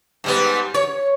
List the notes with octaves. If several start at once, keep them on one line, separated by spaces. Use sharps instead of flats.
G#2 G3 B3
C#5